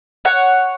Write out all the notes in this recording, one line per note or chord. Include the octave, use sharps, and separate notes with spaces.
C#5 F#5